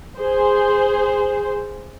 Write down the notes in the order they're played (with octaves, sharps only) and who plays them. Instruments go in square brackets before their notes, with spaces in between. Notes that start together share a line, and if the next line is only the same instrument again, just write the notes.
[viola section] G#4 C5